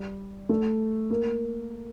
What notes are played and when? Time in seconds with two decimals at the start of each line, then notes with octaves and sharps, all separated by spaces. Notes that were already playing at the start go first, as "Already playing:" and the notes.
Already playing: G3
0.49 A3
1.10 A#3